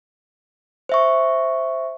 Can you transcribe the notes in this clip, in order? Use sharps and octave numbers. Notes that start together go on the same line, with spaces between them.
C5 E5 C#6